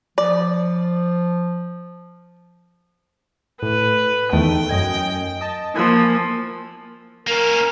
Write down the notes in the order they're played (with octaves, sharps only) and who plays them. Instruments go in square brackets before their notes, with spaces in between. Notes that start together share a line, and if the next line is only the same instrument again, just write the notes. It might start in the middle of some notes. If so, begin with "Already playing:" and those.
[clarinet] F3 [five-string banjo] D5
[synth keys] A2 [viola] B4
[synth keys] E2 D#3 A3 [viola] G5
[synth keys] F#2 D#5 G#5
D#5 A5
[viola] F3 A#3 [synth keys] G#5 B5 E6
[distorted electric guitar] A#3 C#4 [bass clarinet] A#4